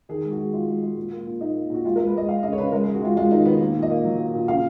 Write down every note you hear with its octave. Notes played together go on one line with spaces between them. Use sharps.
D#3 G#4
G#3
F#4
G#3
G#3 F4
G#3
G#3
A#2
A#3
A#2
A#3 D#4
A#3
A#2 F#4
G#3 F4
G#3 A#4
B4
G#3 D#5
G#3 F5
C#3 D#5
C#5
C#3 B4
G#3 A#4
G#3 G#4
F#4
G#3 F4
G#3 F4
D#3 D#4
D#3 B3
A#3
A#2
D#5
A#3
F#3
A#3
A#2
C#3 F5